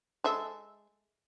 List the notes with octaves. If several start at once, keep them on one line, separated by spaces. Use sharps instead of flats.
G#3 A4 E5